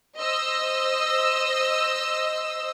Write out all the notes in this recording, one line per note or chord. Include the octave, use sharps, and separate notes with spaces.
C5 D#5 E6